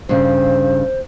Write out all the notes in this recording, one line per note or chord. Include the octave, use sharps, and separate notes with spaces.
G2 C#3 C5